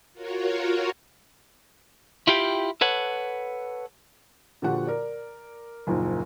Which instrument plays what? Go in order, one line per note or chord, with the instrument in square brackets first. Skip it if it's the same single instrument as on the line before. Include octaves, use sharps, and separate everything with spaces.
[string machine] F4 F#4 A#4 C#5
[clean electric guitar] E4 F4 G4 F5 G5
A4 B4 C#5 F#5
[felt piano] A#2 D3 F3 F#4 G4 F#5
A#4 D5
F#1 D#2 A#2 F3